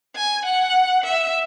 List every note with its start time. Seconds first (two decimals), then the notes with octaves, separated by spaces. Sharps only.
0.16 G#5
0.45 F#5
1.04 E5